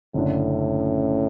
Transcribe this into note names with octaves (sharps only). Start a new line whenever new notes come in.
F#1 F#2 A2 D3